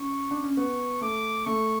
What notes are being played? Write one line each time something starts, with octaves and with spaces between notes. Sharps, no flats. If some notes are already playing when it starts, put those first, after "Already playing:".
Already playing: C#4 C#6
D4
C#4
B3 C#6
A3 D6
A3 C#6